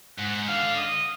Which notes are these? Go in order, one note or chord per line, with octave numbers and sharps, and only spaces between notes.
G#2 F#5
D3 F5
D#5